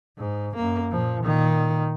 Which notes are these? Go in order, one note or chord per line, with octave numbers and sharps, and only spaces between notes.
G#2
F#2 A#3
A#2 F3
A#2 D#3